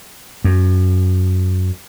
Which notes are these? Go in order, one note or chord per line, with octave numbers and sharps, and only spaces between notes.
F#2